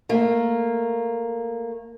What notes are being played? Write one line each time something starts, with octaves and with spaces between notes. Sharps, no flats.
A3 A#3